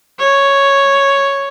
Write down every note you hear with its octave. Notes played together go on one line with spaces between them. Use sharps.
C#5